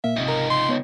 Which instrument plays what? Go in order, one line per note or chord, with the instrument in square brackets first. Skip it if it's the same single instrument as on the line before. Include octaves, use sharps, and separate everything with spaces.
[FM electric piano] A#2 A#3 F5 [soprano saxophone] E5
[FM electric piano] G#1 C3 [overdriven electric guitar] C#2 D#4
[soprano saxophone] A#4
C6
[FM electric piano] B3 C#5